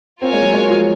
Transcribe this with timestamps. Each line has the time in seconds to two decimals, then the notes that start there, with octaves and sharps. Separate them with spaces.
0.22 C4 F4 A#4 C#5 G#5
0.33 G#3
0.43 F#3
0.54 G#3
0.70 F3